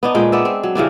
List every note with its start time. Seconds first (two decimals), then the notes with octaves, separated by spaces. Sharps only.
0.03 B3 D4 D#4
0.15 A#2 G#3 B4 G5
0.32 B3 D5 E5
0.45 C4
0.63 F#3
0.75 C#3 E3 G3 D4